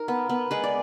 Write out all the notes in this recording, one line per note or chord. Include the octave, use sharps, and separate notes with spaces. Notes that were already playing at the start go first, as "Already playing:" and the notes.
Already playing: D#4 A#4
B3
B3
G#3 B4
D5